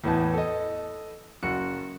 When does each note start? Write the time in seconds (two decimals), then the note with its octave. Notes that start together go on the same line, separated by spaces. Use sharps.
0.04 E2 A2 B3 A5
0.34 A4 D#5
1.43 F#1 F#4 C#7